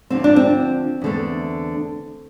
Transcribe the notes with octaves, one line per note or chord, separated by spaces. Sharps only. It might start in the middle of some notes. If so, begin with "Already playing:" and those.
D2 D3 F3 C4
D4
C4
E2 D3 A3